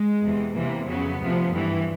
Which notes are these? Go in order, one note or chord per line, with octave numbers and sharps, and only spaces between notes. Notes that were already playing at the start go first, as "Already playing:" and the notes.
Already playing: G#3
E2 C3 E3
E2 C3 E3 A#3
F2 C#3 F#3 B3
D2 C3 F3
G2 E3